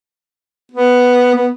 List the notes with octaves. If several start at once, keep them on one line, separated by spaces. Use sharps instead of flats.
B3
B3